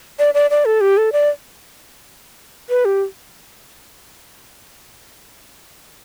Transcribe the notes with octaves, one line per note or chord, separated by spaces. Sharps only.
D5
D5
D5
A4
G4
A4
D5
B4
G4